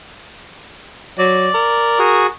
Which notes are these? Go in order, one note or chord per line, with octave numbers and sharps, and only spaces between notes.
F#3 D5
A#4
F#4 G#4